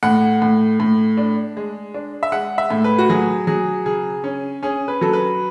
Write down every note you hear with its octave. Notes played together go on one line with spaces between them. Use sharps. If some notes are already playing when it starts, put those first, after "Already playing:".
A2 F#5
A2
A2
D4
G#3
D4
E5
G#3 F#5
E5
A2
B4
F#4
F#3 G#4
F#3 G#4
C#3 G#4
C#4
C#4 G#4
B4
F#3 A4
B4